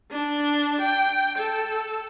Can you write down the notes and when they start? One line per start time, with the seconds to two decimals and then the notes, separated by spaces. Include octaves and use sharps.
0.12 D4
0.81 G5
1.38 A4